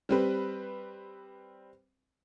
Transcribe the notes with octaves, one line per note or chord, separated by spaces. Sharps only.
G3 C4 B4